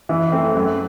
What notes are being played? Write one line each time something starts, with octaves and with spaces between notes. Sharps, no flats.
E3
A3 C4
F#2